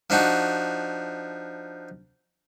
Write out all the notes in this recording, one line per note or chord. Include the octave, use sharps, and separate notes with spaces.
F3 D4 D#4 F#4